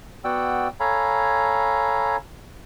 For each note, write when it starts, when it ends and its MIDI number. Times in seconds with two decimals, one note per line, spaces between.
0.24 0.68 59
0.24 0.68 66
0.24 0.68 74
0.24 0.68 78
0.24 0.68 79
0.24 0.68 88
0.80 2.16 69
0.80 2.16 73
0.80 2.16 77
0.80 2.16 80
0.80 2.16 82
0.80 2.16 83